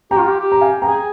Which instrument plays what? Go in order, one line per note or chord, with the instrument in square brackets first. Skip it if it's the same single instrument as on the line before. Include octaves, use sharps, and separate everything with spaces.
[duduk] G4 [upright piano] G5 A#5
[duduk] F4
G4
G4
[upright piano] A#5
F5 G#5
[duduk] G#4 [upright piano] G5 A#5